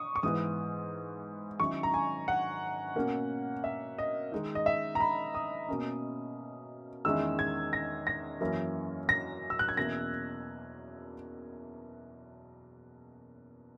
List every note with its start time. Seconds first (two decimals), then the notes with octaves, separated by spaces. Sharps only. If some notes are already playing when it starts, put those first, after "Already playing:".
Already playing: C#6 D#6
0.16 C#6
0.23 G#2 E3 B3 D#6
1.60 D#3 F#3 C#4 E4 C#6
1.83 A#5
1.94 G#5
2.28 F#5
2.95 B2 A#3 C#4
3.64 E5
3.98 D#5
4.32 D#3 G#3 D#4
4.55 D#5
4.66 E5
4.95 A#5
5.00 B5
5.34 D#6
5.69 B2 A#3 C#4
7.05 E2 D#3 G#3 C#4 E4 E6
7.39 G#6
7.73 A#6
8.07 A#6
8.41 F#2 E3 A#3 C#4 E4
9.09 A#6
9.50 E6
9.59 F#6
9.69 G#6
9.77 E2 B2 A#3 C#4 E4 A#6